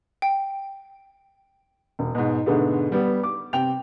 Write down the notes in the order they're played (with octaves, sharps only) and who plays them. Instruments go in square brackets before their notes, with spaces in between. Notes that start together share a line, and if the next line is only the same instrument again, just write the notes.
[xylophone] G5
[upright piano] E1
G#2 B2
G#2 B2 D3 G#3 A3 B3
G3 B3
D6
C3 G5 F7